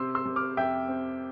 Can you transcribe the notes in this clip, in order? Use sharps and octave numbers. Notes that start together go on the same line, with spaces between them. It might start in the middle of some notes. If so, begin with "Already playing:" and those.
Already playing: C3 C4 C6 E6
C6 E6
C3
D6 F6
F2 E5 G5
C4